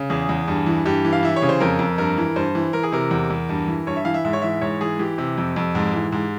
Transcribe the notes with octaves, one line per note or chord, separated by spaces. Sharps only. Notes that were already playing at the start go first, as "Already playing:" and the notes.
Already playing: C#3
E2 G#4
E2
G2
E3
G2 G4
E3
F5
E3 E5
C#5
C#3
C5
F2 A#4
F2
G2 A#4
E3
G2 C5
E3
E3 A#4
G#4
C3 A#4
E2
E2
G2
E3
G2 C#5
E5
E3 F5
E5
G#2 E5
C#5
E3 E5
G#2 C#5
E3 G#4
E3 G4
C3
F2
F2
G#2
E3
G#2